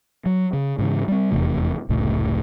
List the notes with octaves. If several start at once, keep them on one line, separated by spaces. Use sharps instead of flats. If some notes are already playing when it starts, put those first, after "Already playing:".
F#3
C#3
G#2 C#3 E3
G3 C4
F1 E2 C3 A3
F1 C#2 A2 A3